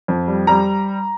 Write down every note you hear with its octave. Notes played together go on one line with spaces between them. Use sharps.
F2
G3
G3 A#5